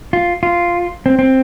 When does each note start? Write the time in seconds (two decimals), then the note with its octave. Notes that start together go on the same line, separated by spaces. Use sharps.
0.13 F4
0.43 F4
1.06 C4
1.19 C4